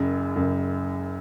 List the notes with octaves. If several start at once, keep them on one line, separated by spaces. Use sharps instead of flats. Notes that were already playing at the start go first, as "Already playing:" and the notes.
Already playing: F#1 F#2 C#3
F#1 F#2 C#3